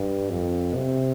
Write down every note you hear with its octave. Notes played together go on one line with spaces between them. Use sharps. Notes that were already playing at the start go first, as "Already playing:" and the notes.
Already playing: G2
F2
C3